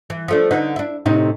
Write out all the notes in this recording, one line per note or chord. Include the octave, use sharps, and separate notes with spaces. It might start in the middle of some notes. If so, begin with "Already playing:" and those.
E3
F3 A3 D4
D3 D#4 B4
D4 E4
A2 C3 D#4